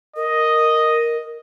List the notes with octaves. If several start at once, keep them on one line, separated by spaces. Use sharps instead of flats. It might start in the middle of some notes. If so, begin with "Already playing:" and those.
A#4 D#5